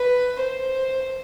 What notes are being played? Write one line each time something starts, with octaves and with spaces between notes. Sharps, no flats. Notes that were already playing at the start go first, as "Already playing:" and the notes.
Already playing: B4
C5